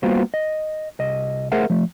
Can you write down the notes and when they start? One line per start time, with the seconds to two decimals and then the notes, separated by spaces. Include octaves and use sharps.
0.03 G3 A#3 B3 F4 F#4 C5
0.34 D#5
1.00 C2 D#5
1.52 A3 G#4 A#4 C5 E5 F#5
1.70 F3 A3